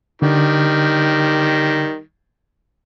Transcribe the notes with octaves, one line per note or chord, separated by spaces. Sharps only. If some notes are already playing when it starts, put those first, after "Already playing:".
D3 D#3 G3